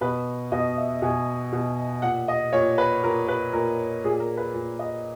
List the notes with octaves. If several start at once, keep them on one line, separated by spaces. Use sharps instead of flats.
B2 B4
B2 D#5
E5
B2 G#5
B2
A#2 F#5
D#5
A#2 C#5
B4
A#2 A#4
B4
A#2 A#4
A#2 G#4
A#4
B4
A#2
D#5